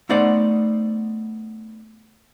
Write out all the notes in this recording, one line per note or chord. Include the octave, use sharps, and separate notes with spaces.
A3 B3 D#4 C5 D5 F#5